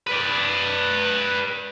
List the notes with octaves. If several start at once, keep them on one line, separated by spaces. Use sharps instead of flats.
B4 D5